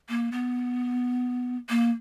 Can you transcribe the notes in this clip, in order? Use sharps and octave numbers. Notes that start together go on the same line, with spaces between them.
A#3
B3
A#3